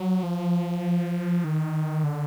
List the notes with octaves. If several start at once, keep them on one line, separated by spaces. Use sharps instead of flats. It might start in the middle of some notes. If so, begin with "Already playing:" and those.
Already playing: F#3
F3
D#3
D3